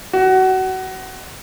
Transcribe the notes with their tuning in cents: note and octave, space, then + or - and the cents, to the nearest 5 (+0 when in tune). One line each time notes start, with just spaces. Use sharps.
F#4 +25